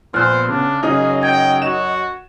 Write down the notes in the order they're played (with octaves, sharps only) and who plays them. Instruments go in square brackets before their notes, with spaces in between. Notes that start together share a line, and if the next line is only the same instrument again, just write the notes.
[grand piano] A#1 [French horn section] B3 [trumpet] C5 [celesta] F6 F#6
[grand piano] C#3 [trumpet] D4
[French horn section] F#2 F#3 D#5 [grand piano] C#3 D#4 [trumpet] G#4
[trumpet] G5 [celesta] G#6
[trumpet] F#4 [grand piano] E7